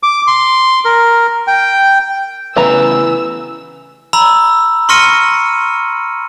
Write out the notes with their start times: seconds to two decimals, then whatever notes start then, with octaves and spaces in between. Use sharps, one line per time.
0.03 D6
0.27 C6
0.85 A#4
1.47 G5
2.57 C#3 E3 A3 B3 B4 A#5 E6
4.13 A#5 B5 E6
4.89 C6 C#6 F6 A#6 C#7 D#7